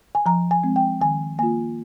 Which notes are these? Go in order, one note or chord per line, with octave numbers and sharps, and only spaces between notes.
G#5
F3 A#5
G#5
G#3 C4
G5
D#3 G#5
A#3 F4 G#5